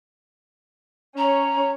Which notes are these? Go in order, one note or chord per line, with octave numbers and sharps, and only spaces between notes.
C#4 C#5 A#5